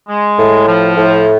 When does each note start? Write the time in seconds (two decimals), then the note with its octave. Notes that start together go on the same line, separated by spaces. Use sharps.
0.08 G#3
0.38 A2
0.67 F3
0.96 A2